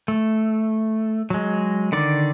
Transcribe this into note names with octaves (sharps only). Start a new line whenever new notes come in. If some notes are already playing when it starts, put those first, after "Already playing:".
A3
F#3 G#3
D3 D#3 D5 D6